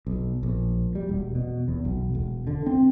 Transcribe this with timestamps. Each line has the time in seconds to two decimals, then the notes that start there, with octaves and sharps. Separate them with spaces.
0.07 B1
0.43 A#1
0.95 G3
1.09 E1
1.35 B2
1.68 E2
1.85 B1
2.15 E1
2.47 D3
2.66 C4